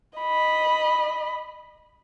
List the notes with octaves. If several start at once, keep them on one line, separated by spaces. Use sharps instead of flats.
D#5 B5